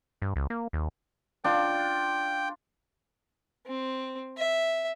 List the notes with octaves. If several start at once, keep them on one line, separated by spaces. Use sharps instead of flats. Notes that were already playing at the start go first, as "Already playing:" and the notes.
G2
C#2
A#3
D#2
D4 F4 G5
C4
E5